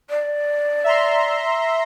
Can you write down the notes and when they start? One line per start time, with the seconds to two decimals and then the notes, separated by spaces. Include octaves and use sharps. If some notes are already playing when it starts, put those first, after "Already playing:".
0.10 D5
0.84 E5 A#5 C6